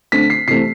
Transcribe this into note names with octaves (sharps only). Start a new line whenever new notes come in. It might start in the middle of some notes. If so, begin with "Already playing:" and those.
D3 A3 C4 B6
C7
C3 E3 A3 C4 C7